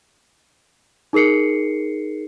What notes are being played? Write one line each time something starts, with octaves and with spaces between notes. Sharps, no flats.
D#4 G#4 A#4 C7 C#7